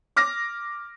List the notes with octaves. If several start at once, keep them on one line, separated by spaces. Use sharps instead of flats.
D6 F6 A#6